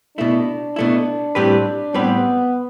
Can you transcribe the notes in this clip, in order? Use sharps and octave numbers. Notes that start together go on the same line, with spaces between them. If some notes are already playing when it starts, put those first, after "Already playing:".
B2 A3 D4 E4
B2 A3 E4
A2 G3 C4 G4 B4
A2 G3 B3 C4 G4 B4